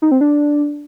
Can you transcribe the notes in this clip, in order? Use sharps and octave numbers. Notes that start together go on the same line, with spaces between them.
D#4
C4
D4